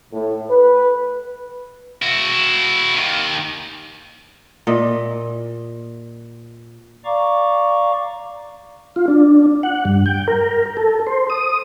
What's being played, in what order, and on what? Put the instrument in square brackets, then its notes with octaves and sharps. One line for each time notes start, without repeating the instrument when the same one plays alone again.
[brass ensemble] A2
B4
[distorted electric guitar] E4 F#4
D#2 D#3
[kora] A#2 D#5 E5
[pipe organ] D5 F5 A#5 C#6 D6
[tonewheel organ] F4
D4
F#5
G2
G5
A#4
A4
C5
D#6